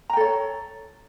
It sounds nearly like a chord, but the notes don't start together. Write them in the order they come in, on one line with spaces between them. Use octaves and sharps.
A#5 G5 A4 C#5